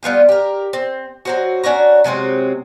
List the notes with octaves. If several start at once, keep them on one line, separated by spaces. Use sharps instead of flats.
G3 B3 F4 G4
G4 A#4
C4
F#3 C4 F#4
C#4 D4 F#4 A#5
C3 F#3 G#3 C4